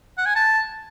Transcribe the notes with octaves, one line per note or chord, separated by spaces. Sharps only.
F#5
G#5
A5